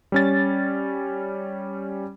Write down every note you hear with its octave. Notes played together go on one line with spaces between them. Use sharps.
G3 C#4 A6